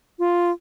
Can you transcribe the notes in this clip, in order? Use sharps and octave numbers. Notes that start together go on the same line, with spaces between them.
F4